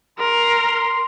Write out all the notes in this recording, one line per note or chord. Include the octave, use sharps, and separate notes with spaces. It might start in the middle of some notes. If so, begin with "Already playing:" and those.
A#4 C6